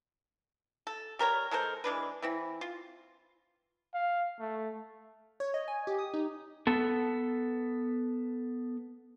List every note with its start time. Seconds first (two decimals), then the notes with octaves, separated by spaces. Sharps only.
0.87 A4
1.19 G3 A#4 C5 C#5
1.51 G#3 A4 A#4 C5
1.84 E3 G#3 D4 B4
2.22 E3 C4 E4
2.61 F4
3.94 F5
4.40 A3
5.40 C#5
5.54 D#5
5.68 G#5
5.87 G4
5.99 D#6
6.14 D#4
6.67 B3 A4